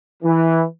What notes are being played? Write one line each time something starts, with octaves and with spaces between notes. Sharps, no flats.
E3